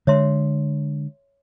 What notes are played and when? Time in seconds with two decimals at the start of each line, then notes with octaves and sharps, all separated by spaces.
0.07 D3 G#3 C#5 E5 C6